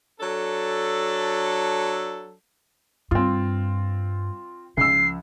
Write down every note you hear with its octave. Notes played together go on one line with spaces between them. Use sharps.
F#3 D4 A4
G2 C4 F4
C#2 F3 E6 C7